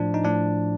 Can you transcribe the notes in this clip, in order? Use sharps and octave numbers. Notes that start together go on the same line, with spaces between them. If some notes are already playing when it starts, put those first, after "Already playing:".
Already playing: A2 F3 D4
D#4
A2 F3 D4